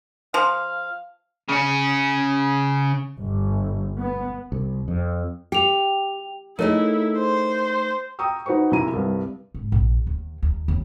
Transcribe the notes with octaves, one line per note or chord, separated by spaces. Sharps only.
F3 F5
C#3 C#4
G1
B3
C2
F2
G4 G5 F7
A3 D#4 E4 G#4 A#4 C#5
C5
G5 A#5 C#6 D#6 E6
D#4 F#4 B4 C5 C#6
B1 F#2 C3 E4 A#5 D#7
C2 G2
G#2
A#1
D#2
D#2
D#2